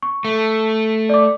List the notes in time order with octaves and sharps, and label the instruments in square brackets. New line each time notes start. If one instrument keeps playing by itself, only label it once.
[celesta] C#6
[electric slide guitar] A3
[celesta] D5 D6